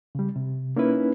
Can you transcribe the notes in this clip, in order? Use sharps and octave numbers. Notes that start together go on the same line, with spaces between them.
C#3 G3
C3
A#3 C#4 D#4 E4 B4